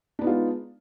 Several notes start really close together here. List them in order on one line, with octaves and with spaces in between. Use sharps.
D4 B3 D#4 F4 G#3